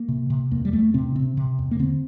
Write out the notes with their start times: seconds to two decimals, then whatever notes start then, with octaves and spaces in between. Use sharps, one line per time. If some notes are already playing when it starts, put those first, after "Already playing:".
Already playing: A#3
0.08 C3
0.30 C3
0.51 E2 A#3
0.65 G3
0.73 E2 A3
0.94 C3 C4
1.16 C3 C4
1.37 C3
1.59 E2
1.71 A#3
1.79 D3 C4